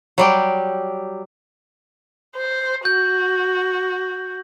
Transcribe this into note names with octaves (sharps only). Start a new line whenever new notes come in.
F#3 G3 G4
C5
F#4 G6